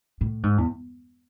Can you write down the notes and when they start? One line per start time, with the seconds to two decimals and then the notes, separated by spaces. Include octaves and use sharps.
0.21 A2
0.43 G#2
0.58 E2